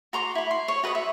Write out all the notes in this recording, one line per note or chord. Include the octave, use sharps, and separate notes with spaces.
F#4 A#5 C6 D6
E4 B5
C6
C#5
F#4 B4 D#5 D#6
E5